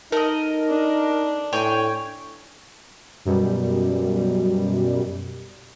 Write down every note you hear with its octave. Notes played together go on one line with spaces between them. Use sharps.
A3 D#4 A#4 D#5
D4
A2 C#5 G5 G#5
F#2 B2 G3